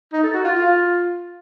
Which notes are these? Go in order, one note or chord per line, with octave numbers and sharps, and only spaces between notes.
D#4
A4
F#4
F4
F4